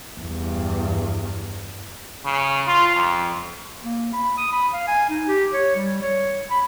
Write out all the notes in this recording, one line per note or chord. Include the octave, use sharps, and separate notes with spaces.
E2 G2
C#3
F4
F2
A#3
B5
D#6
B5
F5
G#5
D#4
G4
C#5
G3
C#5
B5